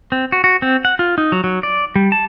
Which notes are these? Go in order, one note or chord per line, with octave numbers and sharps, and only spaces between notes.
C4
F#4
F#4
C4
F#5
F4
D#4
F#3
F#3
D5
G3
A5